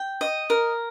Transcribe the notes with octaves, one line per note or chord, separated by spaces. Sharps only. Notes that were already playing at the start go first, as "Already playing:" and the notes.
Already playing: G5
D#5
A#4